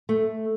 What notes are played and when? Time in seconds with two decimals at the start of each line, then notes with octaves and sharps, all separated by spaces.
0.09 A3